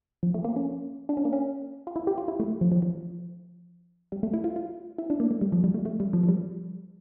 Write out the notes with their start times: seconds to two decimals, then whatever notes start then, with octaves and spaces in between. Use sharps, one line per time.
0.23 F3
0.34 A3
0.44 A#3
0.56 C#4
1.09 D4
1.17 C#4
1.25 A#3
1.33 C#4
1.87 F4
1.96 E4
2.07 G4
2.18 F4
2.28 E4
2.40 A3
2.61 F3
2.72 F3
2.82 F3
4.12 G3
4.23 A3
4.34 E4
4.44 F4
4.56 F4
4.98 E4
5.10 D4
5.20 A#3
5.31 A3
5.41 G3
5.52 F3
5.64 G3
5.74 A3
5.85 A3
6.00 G3
6.13 F3
6.23 F3
6.29 G3